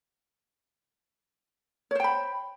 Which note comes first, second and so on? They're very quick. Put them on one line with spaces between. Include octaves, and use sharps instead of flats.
C#5 C5 G5 B5